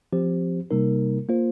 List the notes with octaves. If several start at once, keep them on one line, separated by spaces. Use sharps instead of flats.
F3 C4 G4 C5
C3 G3 A#3 D#4 A#4
A#3 F4 C5